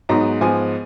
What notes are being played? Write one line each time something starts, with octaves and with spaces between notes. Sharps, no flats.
G#2 F#3 B3 D#4 A#5
G#2 F3 B3 G#5